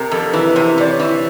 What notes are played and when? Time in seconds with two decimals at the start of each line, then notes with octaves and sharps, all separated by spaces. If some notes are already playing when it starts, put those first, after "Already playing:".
Already playing: C3 A4 A#4
0.11 F2 A4
0.33 E3 B4
0.56 C3 C5
0.78 C3 D5
0.88 C#5
0.99 E3